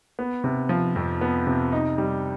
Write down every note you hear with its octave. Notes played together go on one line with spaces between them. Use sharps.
B3
C3
F3
F2
B3
C3
D#4
G3